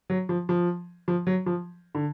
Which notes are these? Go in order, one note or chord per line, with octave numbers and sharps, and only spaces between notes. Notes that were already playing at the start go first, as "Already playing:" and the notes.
F#3
F3
F3
F3
F#3
F3
D3